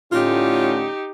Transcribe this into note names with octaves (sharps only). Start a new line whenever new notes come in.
A2 D3 C#4 D#4 F4 G4